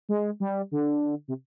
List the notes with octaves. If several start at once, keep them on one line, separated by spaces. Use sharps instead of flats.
G#3
G3
D3
C3